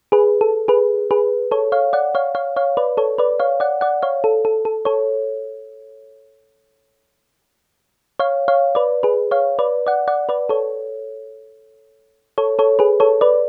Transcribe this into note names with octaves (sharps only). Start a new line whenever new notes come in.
G#4 B4
A4
G#4 B4
G#4 B4
A4 C#5
C#5 F5
D5 F#5
C#5 F5
C#5 F5
C#5 F5
B4 D5
A4 C#5
B4 D5
C#5 F5
D5 F#5
D5 F#5
C#5 F5
A4
A4
A4
A4 C#5
C#5 F5
C#5 F5
B4 D5
G#4 B4
C#5 F5
B4 D5
D5 F#5
D5 F#5
B4 D5
A4 C#5
A4 C#5
A4 C#5
G#4 B4
A4 C#5
B4 D5